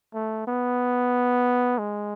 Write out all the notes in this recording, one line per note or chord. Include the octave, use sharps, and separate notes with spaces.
A3
B3
G#3